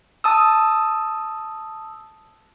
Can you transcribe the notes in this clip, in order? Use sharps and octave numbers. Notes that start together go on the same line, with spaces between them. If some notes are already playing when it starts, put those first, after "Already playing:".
A5 D#6 E6